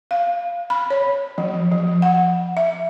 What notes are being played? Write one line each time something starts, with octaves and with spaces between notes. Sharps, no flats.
F5
B5
C#5
F3
F3
F#5
E5